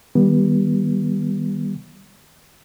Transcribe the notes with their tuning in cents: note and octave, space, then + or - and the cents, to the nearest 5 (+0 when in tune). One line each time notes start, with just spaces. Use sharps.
D#3 +0 G3 +0 B3 -30